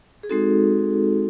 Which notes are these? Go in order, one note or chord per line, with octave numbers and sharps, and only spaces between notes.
G#4
G#3 C4 D#4 F#4 A4